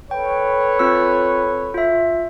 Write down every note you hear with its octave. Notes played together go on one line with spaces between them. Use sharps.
A4 B4 C#5 G5
C4 F4 E6
F4 E5